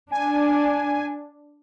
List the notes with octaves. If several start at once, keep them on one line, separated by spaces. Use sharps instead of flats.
D4 G#5